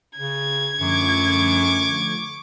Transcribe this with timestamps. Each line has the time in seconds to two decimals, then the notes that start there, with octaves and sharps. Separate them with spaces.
0.18 C#3 G#6
0.81 F#2 D3 F3 A3 C#6 D6